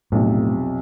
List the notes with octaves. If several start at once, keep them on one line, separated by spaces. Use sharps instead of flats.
B1 F2 A2 C3